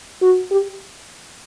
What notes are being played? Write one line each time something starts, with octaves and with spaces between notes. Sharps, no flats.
F#4
G4